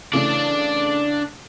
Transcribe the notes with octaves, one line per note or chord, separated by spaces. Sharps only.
C#3 E3 A3 D4 D5